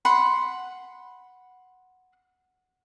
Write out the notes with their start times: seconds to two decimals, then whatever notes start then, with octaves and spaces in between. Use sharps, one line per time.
0.05 F#5 B5 C6